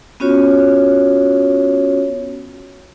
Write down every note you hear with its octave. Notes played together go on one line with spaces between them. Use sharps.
B3 C#4 F4 F#4 C#5